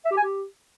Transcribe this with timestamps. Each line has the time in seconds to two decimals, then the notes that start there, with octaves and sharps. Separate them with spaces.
0.05 E5
0.11 G4
0.17 G#5
0.23 G4